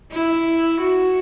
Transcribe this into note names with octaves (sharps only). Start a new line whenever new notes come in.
E4
F#4